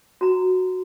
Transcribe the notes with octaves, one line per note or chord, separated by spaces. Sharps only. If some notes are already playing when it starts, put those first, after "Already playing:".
F#4 A#5